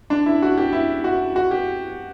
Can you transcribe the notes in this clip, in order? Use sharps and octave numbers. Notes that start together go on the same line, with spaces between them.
D4
E4
F#4
G4
E4
F#4
F#4
G4